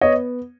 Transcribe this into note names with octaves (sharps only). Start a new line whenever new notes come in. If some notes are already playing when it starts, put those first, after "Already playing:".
B3 C#5 D#5